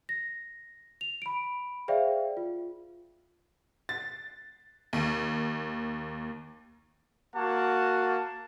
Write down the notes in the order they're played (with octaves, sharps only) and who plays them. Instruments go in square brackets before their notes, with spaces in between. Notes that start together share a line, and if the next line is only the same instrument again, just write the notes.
[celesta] A#6
F7
B5 D7
G#4 C5 D5 E5 F5 G5
F4
[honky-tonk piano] A6
D#2
[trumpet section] A#3 F#4 F#5 A5